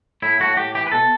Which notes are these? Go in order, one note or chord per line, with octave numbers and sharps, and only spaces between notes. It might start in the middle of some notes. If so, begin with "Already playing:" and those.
A2 E4
A2 F#4
A2 G4
E3 G4
B4
B2 A4